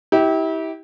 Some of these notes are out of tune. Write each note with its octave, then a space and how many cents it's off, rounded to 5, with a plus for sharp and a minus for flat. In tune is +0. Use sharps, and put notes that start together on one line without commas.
E4 -35 G4 -10